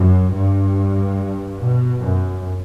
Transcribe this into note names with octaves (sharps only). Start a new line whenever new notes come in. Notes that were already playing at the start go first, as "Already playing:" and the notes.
Already playing: F#2
G2
B2
F#2